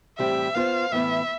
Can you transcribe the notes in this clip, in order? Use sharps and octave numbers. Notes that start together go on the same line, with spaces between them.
A2 E3 G3 C4 G4 E5
B3 F4 C5 F5
A2 E3 B3 E4 E5